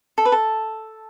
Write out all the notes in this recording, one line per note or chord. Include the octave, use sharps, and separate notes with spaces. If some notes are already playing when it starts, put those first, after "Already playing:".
A4
B4
A4